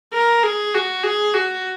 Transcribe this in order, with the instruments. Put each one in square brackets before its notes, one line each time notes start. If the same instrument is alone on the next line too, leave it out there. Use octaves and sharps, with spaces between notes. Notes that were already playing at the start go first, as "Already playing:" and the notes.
[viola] A#4
G#4
F#4
G#4
F#4